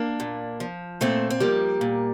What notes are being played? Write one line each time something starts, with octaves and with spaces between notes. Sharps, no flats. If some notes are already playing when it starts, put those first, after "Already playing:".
Already playing: A#3 D4
A#2
F3
A#2 A3 C4
C4
F3 G3 A#3
A#2